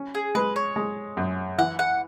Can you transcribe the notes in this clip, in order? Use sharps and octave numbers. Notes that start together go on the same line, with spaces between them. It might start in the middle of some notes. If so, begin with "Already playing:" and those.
Already playing: C#4
G#4
G#3 B4
C#5
G#3
F#2
E3 F#5
F#5